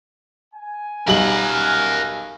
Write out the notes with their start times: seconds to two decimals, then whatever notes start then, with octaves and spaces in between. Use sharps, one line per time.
0.54 G#5
1.07 B1 G3 A#4 F#5 F#7